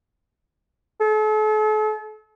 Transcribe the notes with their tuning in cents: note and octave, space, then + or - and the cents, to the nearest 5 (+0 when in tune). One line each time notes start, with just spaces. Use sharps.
A4 -40